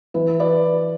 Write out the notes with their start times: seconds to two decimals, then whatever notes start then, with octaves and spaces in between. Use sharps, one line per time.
0.14 E3 B4
0.39 B4 D5